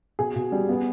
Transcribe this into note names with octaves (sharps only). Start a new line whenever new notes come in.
B2 G#4
B2
G3
B3